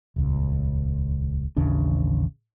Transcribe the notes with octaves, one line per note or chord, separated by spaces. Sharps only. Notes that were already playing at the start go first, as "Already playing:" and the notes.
D#1 C#2
A1 D#2 C#3 D4